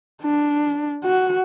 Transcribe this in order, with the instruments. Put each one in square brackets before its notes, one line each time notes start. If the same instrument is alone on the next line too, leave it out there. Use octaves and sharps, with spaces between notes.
[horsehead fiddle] D4
F#4